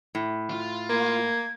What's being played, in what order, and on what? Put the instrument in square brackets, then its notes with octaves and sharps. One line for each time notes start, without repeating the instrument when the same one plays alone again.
[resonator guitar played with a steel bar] A2
[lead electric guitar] F4
[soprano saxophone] A#3 [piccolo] G#6